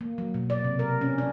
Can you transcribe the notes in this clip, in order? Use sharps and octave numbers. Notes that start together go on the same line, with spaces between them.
A#3
F#3
B2
D5
C3
A#4
C#4
D4